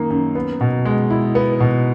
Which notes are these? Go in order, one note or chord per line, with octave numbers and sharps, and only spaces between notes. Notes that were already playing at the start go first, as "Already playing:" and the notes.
Already playing: F#2 D#3 A#3 D#4
F#2
B3
B2
G#3
E4
B3
B2